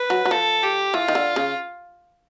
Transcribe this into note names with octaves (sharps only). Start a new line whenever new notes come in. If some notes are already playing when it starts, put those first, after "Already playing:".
Already playing: B4
F#3
F#3
F3 A4
G4
E3 F4
D#3
D3
C#3